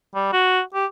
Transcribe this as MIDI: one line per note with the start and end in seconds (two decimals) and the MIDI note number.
0.15 0.32 55
0.33 0.61 66
0.74 0.86 67